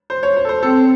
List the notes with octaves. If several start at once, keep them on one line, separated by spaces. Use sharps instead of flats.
C5
C#5
C5
A4
C5
C4 A4